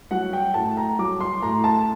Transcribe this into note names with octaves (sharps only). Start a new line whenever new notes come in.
F#3 F#5
G5
A2 A5
A#5
F#3 D6
C6
A2 A#5
A5